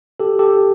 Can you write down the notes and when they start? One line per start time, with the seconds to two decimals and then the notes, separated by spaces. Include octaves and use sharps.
0.20 G4 A4
0.39 G4 A4